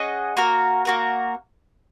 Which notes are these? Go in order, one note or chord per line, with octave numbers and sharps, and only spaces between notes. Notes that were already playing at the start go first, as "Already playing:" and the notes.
Already playing: C#4 G#4 D#5 F#5
A#3 F#4 A#4
A#3 F#4 A#4